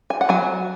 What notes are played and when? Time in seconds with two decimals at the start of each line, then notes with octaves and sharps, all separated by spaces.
0.10 G#5
0.21 F#5
0.29 F#3 G#5